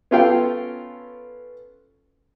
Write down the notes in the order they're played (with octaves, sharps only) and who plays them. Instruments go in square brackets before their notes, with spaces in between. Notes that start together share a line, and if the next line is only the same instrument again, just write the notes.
[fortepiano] B3 C#4 F4 A4 F5 G5